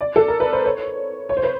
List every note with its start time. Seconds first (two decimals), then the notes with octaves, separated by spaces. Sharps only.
0.01 D5
0.16 A4
0.28 A#4
0.40 B4
0.53 C5
0.65 C#5
1.29 C#5
1.37 C5
1.43 B4